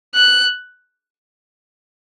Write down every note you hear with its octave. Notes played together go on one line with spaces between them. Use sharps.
F#6